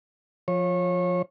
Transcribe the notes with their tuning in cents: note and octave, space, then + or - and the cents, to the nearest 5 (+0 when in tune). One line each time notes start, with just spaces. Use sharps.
F3 +10 C#5 -25